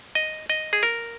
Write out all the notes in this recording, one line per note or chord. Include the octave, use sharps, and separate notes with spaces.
D#5
D#5
G#4
A#4